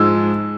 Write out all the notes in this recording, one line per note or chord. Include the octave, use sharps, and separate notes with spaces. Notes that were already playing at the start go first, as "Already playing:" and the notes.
Already playing: G#2 F3 G#3 E6